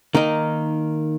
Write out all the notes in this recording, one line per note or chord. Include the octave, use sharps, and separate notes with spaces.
D#3 A#3 D#4